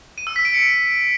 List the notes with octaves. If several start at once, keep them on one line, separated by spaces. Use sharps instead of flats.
D#7
E6
B6
D7
C#7